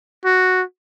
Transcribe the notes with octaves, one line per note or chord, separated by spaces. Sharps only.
F#4